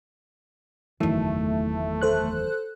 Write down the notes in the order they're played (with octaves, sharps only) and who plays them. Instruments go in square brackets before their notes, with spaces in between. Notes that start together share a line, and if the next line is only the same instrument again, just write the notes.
[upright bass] F#1 E2 [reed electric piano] D#3 F#3 [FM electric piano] E3 [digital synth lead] A3
[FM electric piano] A4 C5 F#6